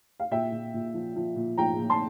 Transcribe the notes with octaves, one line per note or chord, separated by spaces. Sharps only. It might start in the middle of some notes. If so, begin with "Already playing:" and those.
F5
A#2 E5 G5
A#2
A#2
F3
F3
A#2
F3 G5 A#5
A#2
A5 C6